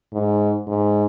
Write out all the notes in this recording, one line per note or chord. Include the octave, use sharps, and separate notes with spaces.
G#2
G#2